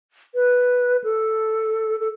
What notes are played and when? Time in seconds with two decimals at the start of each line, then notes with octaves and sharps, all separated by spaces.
0.35 B4
1.04 A4
2.00 A4